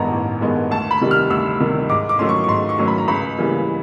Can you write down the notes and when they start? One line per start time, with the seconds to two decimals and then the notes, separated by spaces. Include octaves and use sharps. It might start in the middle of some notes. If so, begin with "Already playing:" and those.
Already playing: A1 G2 D#3 G#3 B3 A#5
0.12 A1
0.41 G2 D#3 G#3 B3
0.71 D2 A5
0.91 B5
1.01 C3 D#3 G3
1.11 F6
1.30 D2 E6
1.60 C3 D#3 G3
1.89 G#2 D6
2.09 D6
2.19 D#3 F#3 A3 C#4 C6
2.29 C#6
2.44 C#6
2.48 G#2 C6
2.69 C#6
2.79 D#3 F#3 A3 C#4
2.88 B5
2.98 A#5
3.08 C#2 B5
3.38 C#3 E3 G3 A#3